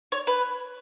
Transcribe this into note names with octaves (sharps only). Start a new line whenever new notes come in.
C#5
B4